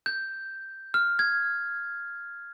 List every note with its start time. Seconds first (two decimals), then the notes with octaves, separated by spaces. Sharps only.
0.06 G6
0.94 F6
1.19 G#6